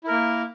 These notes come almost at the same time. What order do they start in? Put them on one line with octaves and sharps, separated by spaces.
E4 A#4 A#3